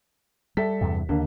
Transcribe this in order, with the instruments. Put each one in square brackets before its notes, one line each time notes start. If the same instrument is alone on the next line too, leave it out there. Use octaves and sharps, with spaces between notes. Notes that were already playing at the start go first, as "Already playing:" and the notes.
[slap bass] G3 [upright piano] A4 E5 B6
[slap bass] E2 G2 C3
[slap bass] D#2 [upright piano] D3 A#3